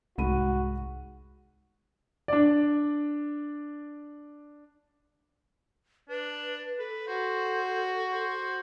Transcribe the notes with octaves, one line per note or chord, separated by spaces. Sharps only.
C2 G#2 F#4 B5 D#7
D4 D5
D4 B4
A4 B4
F#4 C5
C5